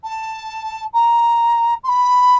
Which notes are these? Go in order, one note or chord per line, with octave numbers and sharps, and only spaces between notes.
A5
A#5
C6
B5